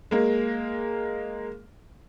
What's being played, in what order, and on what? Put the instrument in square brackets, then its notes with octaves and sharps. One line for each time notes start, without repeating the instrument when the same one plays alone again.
[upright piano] G#3 A#3